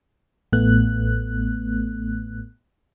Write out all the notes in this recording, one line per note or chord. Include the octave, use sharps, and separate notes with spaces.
A1 A2 A3 B3 F#6